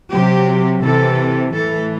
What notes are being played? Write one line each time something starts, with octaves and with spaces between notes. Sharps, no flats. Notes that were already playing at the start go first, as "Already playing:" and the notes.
C3 F#3 G4
C3 E3 A4
A2 E3 A4